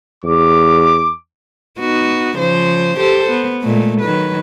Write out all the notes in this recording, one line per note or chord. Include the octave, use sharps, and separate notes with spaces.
E2 D6
B3 D#4 F#4
C#3 F3 C5
G4 A4 C5
B3
A#2 G#3 A3
D#3 F#3 B4